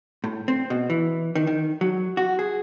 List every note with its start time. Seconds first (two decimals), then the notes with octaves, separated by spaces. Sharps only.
0.24 A2
0.48 C4
0.70 B2
0.90 E3
1.35 D#3
1.47 D#3
1.81 F#3
2.17 F#4
2.39 G#4